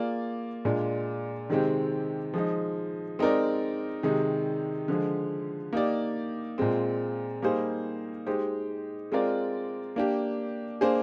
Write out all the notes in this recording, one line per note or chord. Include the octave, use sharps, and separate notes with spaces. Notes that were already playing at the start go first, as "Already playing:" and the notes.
Already playing: A#3 F4 G#4 D5
A#2 G#3 D4
C3 D#3 G#3 C4 G4
F3 G#3 D#4
G#3 C4 D#4 A#4 D5
C3 D#3 G#3 D#4
D3 F3 G#3
A#3 D#4 G4 D5
A#2 G#3 C4
G3 A#3 D#4 G#4 C5
G#3 D#4 G4 C5
G#3 C4 F4 A#4 D5
A#3 D4 G4
A#3 D4 G#4 C5